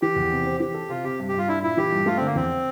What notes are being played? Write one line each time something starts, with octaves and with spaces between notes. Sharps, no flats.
E3 G4
E2
C3
C4
E3 G4
A4
C3 F4
C3 G4
G2
G4
G2 F4
D4 E4
A#2 E4
E3 G4
G2
A3 F4
D3 C4
A#3
E2 C4